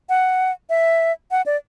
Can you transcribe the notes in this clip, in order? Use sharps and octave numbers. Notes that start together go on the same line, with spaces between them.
F#5
E5
F#5
D5